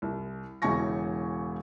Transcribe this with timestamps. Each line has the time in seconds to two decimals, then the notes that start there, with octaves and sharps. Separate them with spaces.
0.02 C2
0.62 E1 C#3 E4 G#5 C#6 A#6